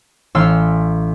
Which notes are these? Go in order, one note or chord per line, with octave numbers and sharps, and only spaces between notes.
A1 F5 C6 E6 C7